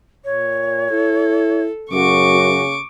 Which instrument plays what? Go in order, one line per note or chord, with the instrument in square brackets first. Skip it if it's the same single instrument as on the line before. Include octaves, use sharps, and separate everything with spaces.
[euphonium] A#2 [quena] C#5
[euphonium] E4 [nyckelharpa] A4
[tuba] F#2 [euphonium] C#3 [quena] F#4 [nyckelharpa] C#6 D6